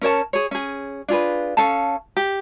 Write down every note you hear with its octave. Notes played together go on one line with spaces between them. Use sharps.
C#4 A#4 C#5 A5
G#4 C#5
C#4 G#4
D4 F4 G#4 B4
C#4 A4 F5 A5
G4